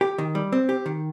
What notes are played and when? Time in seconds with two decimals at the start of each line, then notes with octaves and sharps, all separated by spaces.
0.01 G4
0.18 D#3
0.35 G3
0.52 C4
0.69 G4
0.86 D#3